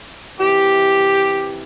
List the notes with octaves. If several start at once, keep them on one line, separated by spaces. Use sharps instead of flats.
C3 E3 G4